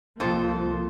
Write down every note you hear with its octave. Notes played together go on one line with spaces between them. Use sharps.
C2 F2 F3 A#3 A4 C5